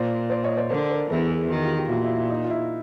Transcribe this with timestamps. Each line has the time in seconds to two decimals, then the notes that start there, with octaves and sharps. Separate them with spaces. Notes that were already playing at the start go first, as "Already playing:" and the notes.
Already playing: A#2 C5 D5
0.30 C5 D5
0.44 C#5 D#5
0.57 C5 D5
0.70 D3 A#4 C5
0.90 A#4 C5
1.09 E2 E3 A4 B4
1.30 G#4 A#4
1.50 D#3 F#4 G#4
1.63 F4 G4
1.76 F4 G4
1.89 A#2 E4 F#4
2.04 E4
2.17 E4
2.30 D#4
2.45 F4
2.50 E4